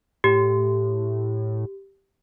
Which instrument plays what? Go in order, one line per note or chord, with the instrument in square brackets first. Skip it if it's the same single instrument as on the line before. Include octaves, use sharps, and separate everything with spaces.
[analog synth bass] A2 [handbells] G4